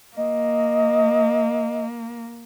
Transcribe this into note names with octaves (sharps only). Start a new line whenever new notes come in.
A#3 D#5